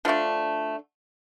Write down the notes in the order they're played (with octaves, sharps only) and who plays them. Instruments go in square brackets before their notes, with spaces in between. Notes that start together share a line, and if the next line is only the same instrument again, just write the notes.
[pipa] D3 F3 A3 D4